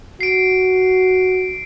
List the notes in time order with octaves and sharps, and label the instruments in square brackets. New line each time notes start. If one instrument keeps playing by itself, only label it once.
[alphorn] F#4 [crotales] C7 D7